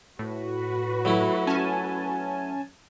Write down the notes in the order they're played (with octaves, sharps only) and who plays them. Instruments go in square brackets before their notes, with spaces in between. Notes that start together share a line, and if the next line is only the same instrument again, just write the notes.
[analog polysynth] A2 [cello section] F#4 B4
[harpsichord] F#3 A3 E4
[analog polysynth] C#4 G#5 A5